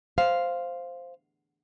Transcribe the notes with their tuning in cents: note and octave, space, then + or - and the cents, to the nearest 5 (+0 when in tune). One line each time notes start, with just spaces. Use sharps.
C5 +0 F5 +0